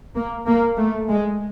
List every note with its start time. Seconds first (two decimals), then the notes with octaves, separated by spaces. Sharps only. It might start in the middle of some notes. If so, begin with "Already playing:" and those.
0.16 A#3
0.47 A#3
0.78 A3
1.08 G#3